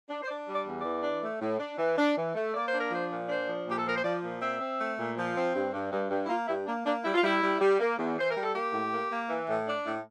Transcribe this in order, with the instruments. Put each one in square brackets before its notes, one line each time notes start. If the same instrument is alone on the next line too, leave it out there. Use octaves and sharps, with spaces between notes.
[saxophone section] D4
C5
D4 D5
G3
D5
E2
D5
E3
D4
A3
A2
D4
E3
D4
E3
A3
A#3 D5
C5
D4
A#4
F3 C5
A#2
D4 C5
F3
A#2 G4
A4
F3 A#4
C5
F3 D5
A#2
C4 E5
C4
A3
A#2
F3
C4
G2
G2
G2
G2
E4
A#3 F4
G2 E4
A#3 D4
A#3 D4
G3 E4
F4
G3 E4
G3
G3
A#3
E2
E3 C5
A#4
G3
A4
A#3 G4
A2
A#3
A#3
E3
A2
D4
A2